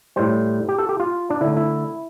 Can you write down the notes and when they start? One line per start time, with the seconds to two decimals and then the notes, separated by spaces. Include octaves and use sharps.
0.16 A2 G3 C5
0.69 G4
0.78 A4
0.89 G4
1.00 F4
1.30 D4
1.41 D3 A3 E4
1.57 E4